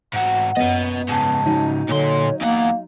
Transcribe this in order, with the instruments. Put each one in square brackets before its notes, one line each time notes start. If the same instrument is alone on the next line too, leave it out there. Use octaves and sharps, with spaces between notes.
[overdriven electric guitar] G#2 F#4 [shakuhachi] F#5
[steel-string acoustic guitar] F#2 B3 [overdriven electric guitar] B4 D#5
[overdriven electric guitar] G#2 C#3 [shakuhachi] A5
[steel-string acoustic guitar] F#3 D#4
[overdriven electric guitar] A#2 C6 [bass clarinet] D3 [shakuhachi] C#5
[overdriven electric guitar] E2 F#5 [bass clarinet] A#3 [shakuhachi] F5